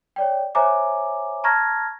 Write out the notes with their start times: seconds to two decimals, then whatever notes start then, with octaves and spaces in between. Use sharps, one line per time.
0.16 C#5 D5 G5
0.55 C5 C#5 E5 G#5 A#5 D6
1.44 A5 A#5 C#6 F6 G#6 A#6